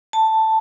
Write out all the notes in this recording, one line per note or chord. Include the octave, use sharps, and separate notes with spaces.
A5